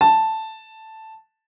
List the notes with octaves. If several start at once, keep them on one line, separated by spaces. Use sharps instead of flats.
A5